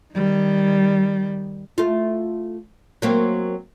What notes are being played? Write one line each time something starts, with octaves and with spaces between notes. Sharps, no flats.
D#3 G3
A3 F4
F#3 A#3 C4